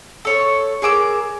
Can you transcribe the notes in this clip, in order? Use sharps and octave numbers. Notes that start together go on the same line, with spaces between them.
A4 C#5 C#6
G#4 A#4 D6 E6